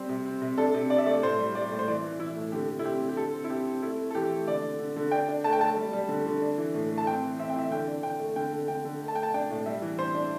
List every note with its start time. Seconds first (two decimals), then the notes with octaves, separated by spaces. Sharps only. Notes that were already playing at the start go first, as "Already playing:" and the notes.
Already playing: G3 C4
0.09 C3
0.25 C4
0.42 C3
0.58 D4 A4
0.74 C3
0.90 D4 D5
0.98 E5
1.06 A3 D5
1.23 A2 C5
1.38 G3
1.55 G3 D5
1.72 A2
1.79 C5
1.88 E3 D5
2.04 E3
2.20 E3 E4
2.36 A2
2.52 D3 G4
2.69 D3
2.79 E4
2.85 C4 G4
3.00 D3
3.09 G4
3.17 D3 A4
3.34 C4
3.44 E4
3.50 C4 G4
3.67 C4
3.82 A3 E4
3.98 A3
4.10 A4
4.15 E3 G4
4.30 A3
4.47 D3 D5
4.63 D3
4.79 D3
4.96 D3
5.11 D4 G5
5.29 D4
5.44 A3 A5
5.53 G5
5.61 A3 A5
5.77 G3
5.93 G3
6.09 D3
6.26 D3
6.42 D4
6.58 E3
6.74 A2
6.91 A3
6.98 A5
7.07 C4 G5
7.23 E3
7.39 C4 E5
7.50 G5
7.55 E3 E5
7.71 D3 G5
7.88 D4
8.03 D3 G5
8.19 A3
8.36 D3 G5
8.53 D3
8.68 D3 G5
8.85 D3
9.02 A3
9.08 A5
9.15 A3 G5
9.23 A5
9.34 D4 G5
9.50 A2
9.66 G3 E5
9.82 E3
9.99 D4 C5
10.14 D4